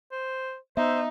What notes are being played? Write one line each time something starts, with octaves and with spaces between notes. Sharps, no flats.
C5
B3 D#4 C5 E5